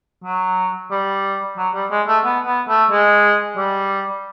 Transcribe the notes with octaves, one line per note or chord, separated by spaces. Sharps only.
F#3
G3
F#3
G3
G#3
A3
B3
B3
A3
G#3
G3